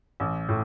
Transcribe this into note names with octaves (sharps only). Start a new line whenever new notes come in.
A1
A2